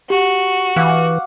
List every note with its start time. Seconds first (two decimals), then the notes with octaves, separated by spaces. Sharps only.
0.10 F#4 G4
0.76 E3 F5 F#5 D6